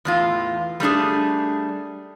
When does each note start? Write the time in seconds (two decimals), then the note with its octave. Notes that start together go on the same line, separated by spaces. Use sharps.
0.05 E2 A2 F4
0.80 G3 A3 D4 G#4